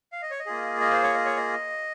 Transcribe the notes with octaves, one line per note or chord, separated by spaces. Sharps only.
F5
D#5
C#5
D#5
A#3 F4 G#4
D#5
C5
C#5
D#5
C#5
D#5